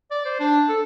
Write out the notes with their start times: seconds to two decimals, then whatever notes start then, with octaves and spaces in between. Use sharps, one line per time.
0.11 D5
0.25 C5
0.40 D4
0.69 A4